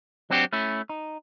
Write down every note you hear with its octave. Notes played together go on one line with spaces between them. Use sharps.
F#3 C4 D4 F#4 G4
A3 C#4 E4
D#4